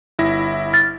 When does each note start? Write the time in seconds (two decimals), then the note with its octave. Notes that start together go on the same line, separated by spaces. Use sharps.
0.19 G1 E4 A#6
0.73 F6 A6